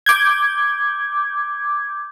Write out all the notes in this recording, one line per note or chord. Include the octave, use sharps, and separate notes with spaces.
D6 G6 G#6